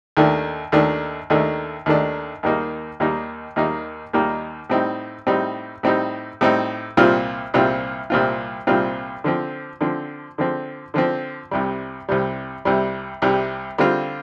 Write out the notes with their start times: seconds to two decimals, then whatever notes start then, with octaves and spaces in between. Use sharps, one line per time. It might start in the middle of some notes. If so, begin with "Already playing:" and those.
0.17 D#2 D#3 A3 D4
0.72 D#2 D#3 A3 D4
1.30 D#2 D#3 A3 D4
1.86 D#2 D#3 A3 D4
2.43 D#2 D#3 G3 A#3 D#4
3.00 D#2 D#3 G3 A#3 D#4
3.56 D#2 D#3 G3 A#3 D#4
4.13 D#2 D#3 G3 A#3 D#4
4.70 A2 G3 C4 D#4
5.27 A2 G3 C4 D#4
5.83 A2 G3 C4 D#4
6.41 A2 G3 C4 D#4
6.97 C2 A#2 G3 C4 F4
7.54 C2 A#2 G3 C4 F4
8.10 C2 A#2 G3 C4 F4
8.67 C2 A#2 G3 C4 F4
9.24 D3 F3 C4
9.81 D3 F3 C4
10.38 D3 F3 C4
10.94 D3 F3 C4
11.51 C2 C3 G3
12.09 C2 C3 G3
12.65 C2 C3 G3
13.22 C2 C3 G3
13.78 D3 G3 C4 F4